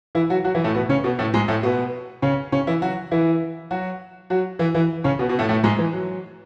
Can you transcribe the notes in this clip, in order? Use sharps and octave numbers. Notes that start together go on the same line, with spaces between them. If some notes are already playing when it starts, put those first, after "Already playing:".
E3 E4
F#3 F#4
F#3 F#4
E3 E4
A2 A3
B2 B3
C#3 C#4
B2 B3
A2 A3
G#2 G#3
A2 A3
B2 B3
C#3 C#4
C#3 C#4
E3 E4
F#3 F#4
E3 E4
F#3 F#4
F#3 F#4
E3 E4
E3 E4
C#3 C#4
B2 B3
B2 B3
A2 A3
A2 A3
G#2 G#3
E3
F#3